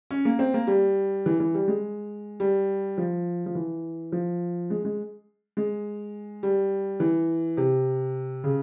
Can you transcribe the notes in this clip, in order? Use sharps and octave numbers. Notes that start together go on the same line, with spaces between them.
C#4
A#3
C4
A#3
G3
E3
E3
G3
G#3
G3
F3
F3
E3
F3
G#3
G#3
G#3
G3
E3
C3
C#3